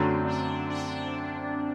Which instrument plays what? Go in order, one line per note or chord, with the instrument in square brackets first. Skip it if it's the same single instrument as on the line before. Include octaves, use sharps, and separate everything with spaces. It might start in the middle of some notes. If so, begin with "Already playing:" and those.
Already playing: [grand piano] F#2 D3 F#3 A3 [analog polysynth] C4
[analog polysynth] D4
D4